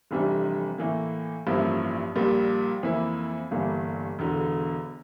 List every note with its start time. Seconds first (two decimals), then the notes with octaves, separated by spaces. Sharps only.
0.11 F1 F2 E3 G3 D4
0.78 A2 E3 A#3
1.47 A1 G2 F3 A#3 E4
2.15 A#1 A#2 G3
2.83 F2 E3 A#3 E4
3.51 G1 G2 E3 A#3
4.19 E1 E2 D3